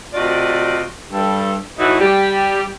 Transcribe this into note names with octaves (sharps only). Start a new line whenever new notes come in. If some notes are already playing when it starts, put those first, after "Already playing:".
C3 A3 F4 F#4 D5 D#5
G2 G3 A4
A2 E3 D#4 F#4
G3 G4